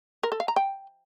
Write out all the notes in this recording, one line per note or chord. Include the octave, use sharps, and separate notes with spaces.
A#4
A4
F5
A#5
G5